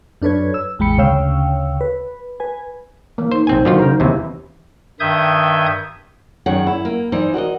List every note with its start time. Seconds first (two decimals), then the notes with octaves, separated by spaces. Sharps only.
0.22 F#2 D4 A4 B4 C#5 G#6
0.54 E6
0.79 A1 E2 G#3 G5 B5 C#7
0.98 D2 C#3 C#5 F5 G5 E6
1.81 B4
2.40 B4 G#5
3.18 E3 A#3
3.32 D#4 C5
3.47 B1 C4 C5 G#5
3.65 D3 D#3 F#3 F4
3.78 C#3 A#4
4.00 D#2 C3 E3 E4
5.00 G2 D#3 E5 D#6 G6 G#6
6.46 F#2 D#3 G#4 C#5 F#5
6.67 E4
6.85 A#3
7.12 E3 D#4 C5 D5
7.34 F#4 A#4 C#5 D#5